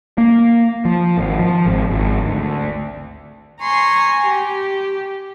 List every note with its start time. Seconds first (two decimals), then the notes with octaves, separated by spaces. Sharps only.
0.18 A#3
0.85 F3
1.17 G#1
1.39 F3
1.66 G#1
1.90 G#1
2.26 D2
3.62 G#5 A#5 C6 C#6
4.27 G4